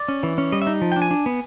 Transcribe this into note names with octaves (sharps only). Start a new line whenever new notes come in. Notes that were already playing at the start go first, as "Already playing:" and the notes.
Already playing: D5
C#4
E3
C#4
G3 D#5
E5
D#4
F3
G5
D4
G#5
D4
B3